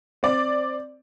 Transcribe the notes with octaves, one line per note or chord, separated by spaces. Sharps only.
C4 D5